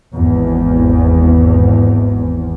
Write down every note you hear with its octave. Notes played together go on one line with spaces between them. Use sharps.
G#1 E2